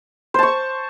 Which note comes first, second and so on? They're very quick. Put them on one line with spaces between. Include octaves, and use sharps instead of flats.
C5 A5 C#6